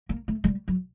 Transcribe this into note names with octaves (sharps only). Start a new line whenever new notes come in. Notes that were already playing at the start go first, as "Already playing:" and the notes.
A#3
A3
G#3
G3
F#3